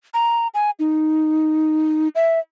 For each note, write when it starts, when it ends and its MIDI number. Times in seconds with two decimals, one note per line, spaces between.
0.14 0.48 82
0.54 0.71 80
0.79 2.08 63
2.15 2.39 76